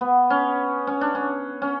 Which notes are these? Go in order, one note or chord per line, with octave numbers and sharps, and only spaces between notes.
B3
C#4
C#4
D4
C#4
C#4